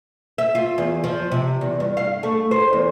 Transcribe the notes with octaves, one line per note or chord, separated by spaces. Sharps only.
E5
F4
E2
F3
C3
E2
G2
F5
A3
C5
E2